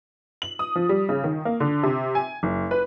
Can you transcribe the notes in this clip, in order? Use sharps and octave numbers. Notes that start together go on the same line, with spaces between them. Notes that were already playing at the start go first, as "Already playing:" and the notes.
F#7
D#6
F3
G3
C#3
D#3
A#3
D3
C3
G#5
F#1
B4